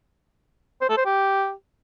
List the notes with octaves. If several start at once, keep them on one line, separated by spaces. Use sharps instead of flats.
C5
A4
C5
G4